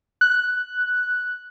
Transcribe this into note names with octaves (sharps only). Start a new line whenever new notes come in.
F#6